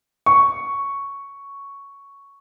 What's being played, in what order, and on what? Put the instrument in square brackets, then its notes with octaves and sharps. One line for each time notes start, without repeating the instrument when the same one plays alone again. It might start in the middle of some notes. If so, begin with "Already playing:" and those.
[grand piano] C#6